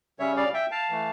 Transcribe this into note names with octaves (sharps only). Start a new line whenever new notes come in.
C#3 G3 C#4 C#5 E5
D5 F5
E5 G5
F5 A5
E3 A3